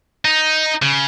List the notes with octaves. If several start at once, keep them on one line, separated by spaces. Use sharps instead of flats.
D#4
C#3